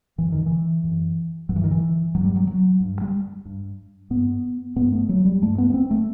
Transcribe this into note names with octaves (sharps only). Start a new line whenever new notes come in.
F#2 E3
D#3
E3
F#2
G2 F#3
E3
D#3
E3
G2 F#3
G3
F#3
F#3
G2
G3
G2
G2 B3
G2 B3
A3
F#3
G3
G2 A3
B3
B3
C4
A3